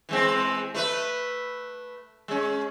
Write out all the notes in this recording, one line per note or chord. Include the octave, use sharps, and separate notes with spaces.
E3 G#3 C4
A3 B4 E5
G#3 C#4